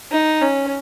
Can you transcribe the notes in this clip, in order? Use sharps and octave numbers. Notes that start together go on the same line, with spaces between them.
D#4
C#4